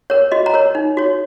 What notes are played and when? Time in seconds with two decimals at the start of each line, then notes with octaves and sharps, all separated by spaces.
0.10 A#4 C#5
0.32 F#4 D#5
0.46 A#5
0.54 A#4 C#5
0.75 D#4
0.97 F#4 C#5